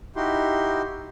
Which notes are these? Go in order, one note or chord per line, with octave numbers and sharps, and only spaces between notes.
D#4 E4 F#4 G4 C6